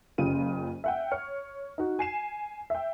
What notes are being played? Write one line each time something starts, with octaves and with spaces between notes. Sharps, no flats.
F#1 C#3 F4 G4 D#7
E5 F#5 G5
C#5 F6 C#7
D#4 F#4
G#5 C7 E7
E5 G5